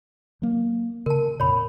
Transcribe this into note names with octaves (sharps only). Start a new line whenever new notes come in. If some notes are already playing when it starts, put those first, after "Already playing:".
F#3 A#3
C#3 A#4 A5
F2 A#2 C#5 B5